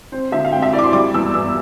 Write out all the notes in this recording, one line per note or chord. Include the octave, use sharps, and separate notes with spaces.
C4 C5
D3 E5
F5
C4 G5
E5
E4 D5
D6
C6
G3 D6
E2 E6
E2 E6